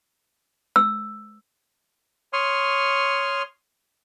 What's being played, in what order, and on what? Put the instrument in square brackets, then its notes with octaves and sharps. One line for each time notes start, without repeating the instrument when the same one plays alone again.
[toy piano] E6
[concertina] C#5 C6 C#6 D#6 F6